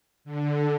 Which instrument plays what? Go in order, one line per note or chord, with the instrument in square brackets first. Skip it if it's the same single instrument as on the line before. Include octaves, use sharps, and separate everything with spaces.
[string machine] D3